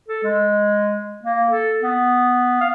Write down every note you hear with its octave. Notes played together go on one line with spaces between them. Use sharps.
A4
G#3
A#3
A4
B3
F5